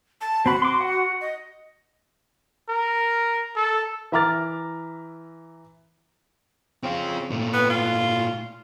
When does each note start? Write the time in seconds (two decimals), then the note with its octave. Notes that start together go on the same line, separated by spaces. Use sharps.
0.21 A5
0.46 C4 F#4 B5
0.62 C6 D6
0.81 F#5
1.21 D#5
2.69 A#4
3.56 A4
4.12 E3 E5 A#5 D6 F6 A6
6.83 C#3 C4 F4
7.31 A#2 A3
7.53 B3
7.70 F4